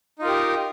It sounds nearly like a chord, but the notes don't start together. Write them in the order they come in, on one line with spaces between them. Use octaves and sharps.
D#4 F4 A#4 G4